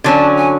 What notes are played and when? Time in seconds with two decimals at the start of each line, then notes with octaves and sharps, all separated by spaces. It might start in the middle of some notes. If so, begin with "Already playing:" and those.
0.04 D3 F#3 C#4 A5
0.37 G#5